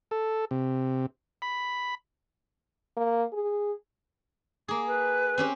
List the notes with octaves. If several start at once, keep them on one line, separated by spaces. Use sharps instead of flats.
A4
C3
B5
A#3
G#4
A#3 G#4 D6
B4
C4 C#4 G4